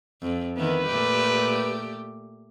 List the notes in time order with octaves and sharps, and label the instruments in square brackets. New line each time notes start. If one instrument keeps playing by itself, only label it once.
[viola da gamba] F2
[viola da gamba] D#3 E3 B3 [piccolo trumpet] B4
[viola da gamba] A#2 A3 G4